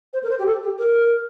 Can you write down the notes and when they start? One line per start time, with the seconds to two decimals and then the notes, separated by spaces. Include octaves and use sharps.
0.13 C5
0.23 A#4
0.30 C5
0.39 G4
0.46 A4
0.63 G4
0.79 A#4